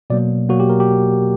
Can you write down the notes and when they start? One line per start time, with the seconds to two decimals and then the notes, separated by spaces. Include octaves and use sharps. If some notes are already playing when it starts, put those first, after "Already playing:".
0.10 B2 F#3 A#3 D5
0.49 B2 F#3 A#3 F#4
0.60 G4
0.69 A#4
0.80 G4